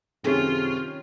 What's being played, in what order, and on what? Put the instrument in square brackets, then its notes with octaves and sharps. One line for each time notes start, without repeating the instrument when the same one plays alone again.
[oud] F#2 G#4 A4 [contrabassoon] C3 [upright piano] D#3 C#4 [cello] F4